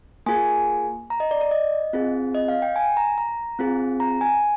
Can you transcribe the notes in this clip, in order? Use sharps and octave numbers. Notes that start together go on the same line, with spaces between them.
A#3 F4 G#4 G#5
A#5
D#5
D5
D5
D#5
C4 F4 G#4
D#5
F5
G5
G#5
A#5
A#5
C4 F4 G#4
A#5
G#5